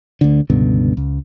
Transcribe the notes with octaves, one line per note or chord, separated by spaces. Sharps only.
D2 D3
C#2 G2 B2 D3
C#2